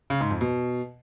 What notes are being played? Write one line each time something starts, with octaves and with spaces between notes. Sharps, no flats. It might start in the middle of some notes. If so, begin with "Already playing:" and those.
C#3
G#2
F2
B2